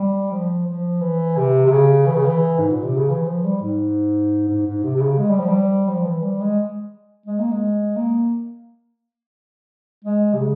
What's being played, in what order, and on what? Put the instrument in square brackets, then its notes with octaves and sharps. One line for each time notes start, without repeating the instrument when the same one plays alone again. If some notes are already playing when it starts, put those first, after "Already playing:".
Already playing: [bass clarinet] G3
F3
F3
E3
C3
C3
C#3
E3
C#3
E3
G#2
A#2
C3
C#3
E3
F3
G3
G#2
G#2
G#2
C3
C3
C#3
G#3
G3
F3
G3
F3
E3
G3
G#3
G#3
A#3
G#3
A#3
G#3
C3
C#3